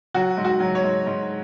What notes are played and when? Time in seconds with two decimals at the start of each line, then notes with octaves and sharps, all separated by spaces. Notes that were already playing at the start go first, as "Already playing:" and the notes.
0.14 F#3 F#4
0.37 G#2
0.45 F#4
0.60 F#3
0.75 C#5
0.83 G#2
1.06 G#2